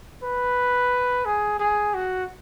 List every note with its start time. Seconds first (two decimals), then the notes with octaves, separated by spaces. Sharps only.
0.23 B4
1.26 G#4
1.59 G#4
1.95 F#4